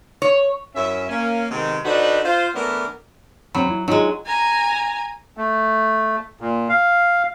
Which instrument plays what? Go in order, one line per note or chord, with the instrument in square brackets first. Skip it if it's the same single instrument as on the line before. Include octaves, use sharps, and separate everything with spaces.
[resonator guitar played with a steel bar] C#5
[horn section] F#2 C#4 E4 E5
A#3 C#4
C3 D#3 G#3 B3 C4
D3 D4 D#4 F#4 B4 C5
F4 C5
E3 A3 B3 D4 A#4
[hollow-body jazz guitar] E2 C4 B5 [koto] F#3
[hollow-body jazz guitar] E4
[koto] F#3 G#3 [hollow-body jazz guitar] D4 D#4 F4
[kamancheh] G#5 A#5
[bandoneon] A3
A#2
F5